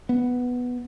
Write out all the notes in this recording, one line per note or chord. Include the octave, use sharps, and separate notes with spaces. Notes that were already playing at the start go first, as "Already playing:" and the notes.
B3